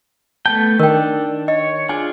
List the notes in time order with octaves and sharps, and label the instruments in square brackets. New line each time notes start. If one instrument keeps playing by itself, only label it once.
[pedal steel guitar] A3 B3 G5 [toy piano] A5
[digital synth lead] D#3 [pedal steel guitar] D4 [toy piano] A#4 G5
[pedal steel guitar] C#5 [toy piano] D#5
[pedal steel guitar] D4 F4 G#4 [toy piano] G#5